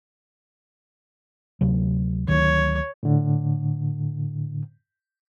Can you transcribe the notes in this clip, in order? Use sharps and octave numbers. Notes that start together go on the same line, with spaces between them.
D2 C3 F#3
D2 D#3 F#3 C#5
A2 D3